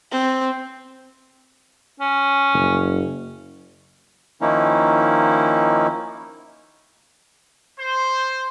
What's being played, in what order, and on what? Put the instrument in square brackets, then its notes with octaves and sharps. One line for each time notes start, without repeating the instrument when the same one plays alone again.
[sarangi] C4
[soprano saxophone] C#4
[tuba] F#1
[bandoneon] D#3 F3 A#3 C#4 D#4 E4
[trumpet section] C5